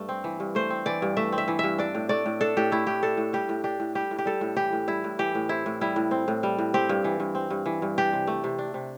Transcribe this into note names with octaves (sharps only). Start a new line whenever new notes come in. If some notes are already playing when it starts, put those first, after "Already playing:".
Already playing: G2 A3
C4
E3
G2
A3 C5
C4
E3 D5
G2
A3 E5
C4
E5
E3
G2 E5
D4 D5
A2
A3 D5
A2
D4 A4
A2 G4
A3 E4
A2 G4
D4 A4
A2
G3 G4
A2
D4 G4
A2
G3 G4
A2
G4
G3 A4
A2
E3 G4
A2
G3 E4
A2
E3 G4
A2
C4 E4
A2
G3 E4
A2
C4
A2
G3
A2
C4 G4
G2
E3
G2
C4
G2
E3
G2
D4 G4
C3
A3
C3
D4
C3